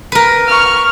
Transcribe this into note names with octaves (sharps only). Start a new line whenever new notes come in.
A#4 B4
C#6 F6